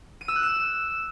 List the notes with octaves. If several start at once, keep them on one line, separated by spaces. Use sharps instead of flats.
D#7
E6
F#6
E7